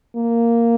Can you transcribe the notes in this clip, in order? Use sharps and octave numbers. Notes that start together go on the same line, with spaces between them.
A#3